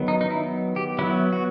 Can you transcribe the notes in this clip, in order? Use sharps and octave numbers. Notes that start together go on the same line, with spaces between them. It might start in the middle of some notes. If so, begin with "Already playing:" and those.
Already playing: D#3 F#3 B3
D#4
D#4
E4
G4
F#3 B3 E4
F#4